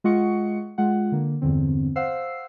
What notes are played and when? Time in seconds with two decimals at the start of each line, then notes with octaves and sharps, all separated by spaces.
0.04 G#3 F4 D#5 F#5 C#6 C#7
0.78 G#3 F4 F#5
1.12 D3 A#3
1.41 E2 G2 D3 C4
1.96 C5 F5 F#5 E6 C7